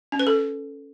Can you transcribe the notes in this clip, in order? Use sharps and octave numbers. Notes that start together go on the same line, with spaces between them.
C#4
B4
A4